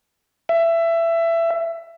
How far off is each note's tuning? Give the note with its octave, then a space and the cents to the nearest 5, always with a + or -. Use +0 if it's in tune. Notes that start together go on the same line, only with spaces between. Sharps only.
E5 +20